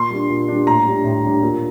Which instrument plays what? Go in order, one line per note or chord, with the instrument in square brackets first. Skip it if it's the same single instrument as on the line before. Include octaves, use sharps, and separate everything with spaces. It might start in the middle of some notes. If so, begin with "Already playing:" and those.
Already playing: [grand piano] A#2 C6
G3 D4
A#2
G3 D4
A2 A#5
G3 D4
A2
G3 D4
A#2